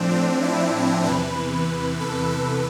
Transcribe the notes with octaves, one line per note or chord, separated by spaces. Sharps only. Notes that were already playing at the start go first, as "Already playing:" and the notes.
Already playing: A2 F3 C4 D4
C4
E4
E2 C3 E3 B4
A4
B4